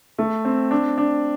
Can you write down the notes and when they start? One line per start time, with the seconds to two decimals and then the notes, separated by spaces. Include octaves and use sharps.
0.18 A3
0.45 C4
0.71 D4
0.98 D4